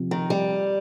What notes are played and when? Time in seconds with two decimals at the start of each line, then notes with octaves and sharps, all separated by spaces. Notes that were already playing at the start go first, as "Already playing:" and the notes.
Already playing: C3 F3 C4
0.11 D#3
0.30 G3